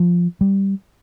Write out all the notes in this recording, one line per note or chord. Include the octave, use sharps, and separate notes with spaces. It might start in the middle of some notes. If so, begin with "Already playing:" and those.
Already playing: F3
G3